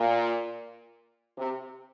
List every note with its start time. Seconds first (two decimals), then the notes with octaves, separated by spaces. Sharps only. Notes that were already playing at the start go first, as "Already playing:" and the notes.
Already playing: A#2
1.38 C3